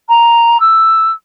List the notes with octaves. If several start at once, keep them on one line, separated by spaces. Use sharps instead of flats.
A#5
E6